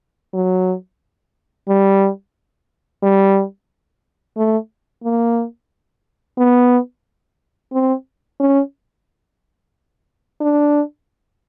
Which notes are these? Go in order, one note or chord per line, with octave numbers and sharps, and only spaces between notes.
F#3
G3
G3
A3
A#3
B3
C4
C#4
D4